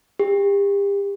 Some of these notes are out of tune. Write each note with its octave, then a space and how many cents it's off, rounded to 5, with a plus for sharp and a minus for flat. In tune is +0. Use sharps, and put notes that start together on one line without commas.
G4 +35